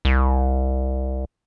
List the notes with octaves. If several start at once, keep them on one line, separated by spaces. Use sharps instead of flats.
C2